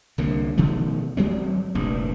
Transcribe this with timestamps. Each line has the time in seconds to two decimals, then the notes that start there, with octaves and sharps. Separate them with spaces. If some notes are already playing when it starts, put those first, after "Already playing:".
0.18 C2 D3 A#3
0.57 B2 D#3 F3 A3
1.17 G#1 F#3 G#3 C4
1.75 F1 A#1 G2